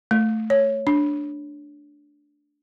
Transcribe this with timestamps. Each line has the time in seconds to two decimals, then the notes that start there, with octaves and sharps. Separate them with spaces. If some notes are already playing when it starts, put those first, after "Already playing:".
0.11 A3
0.50 C#5
0.87 D4